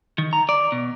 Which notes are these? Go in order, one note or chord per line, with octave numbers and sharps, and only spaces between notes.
D#3
A#5
D5
B2